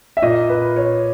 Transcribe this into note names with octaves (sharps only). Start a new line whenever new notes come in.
E5
A#2 D#5
B4
C#5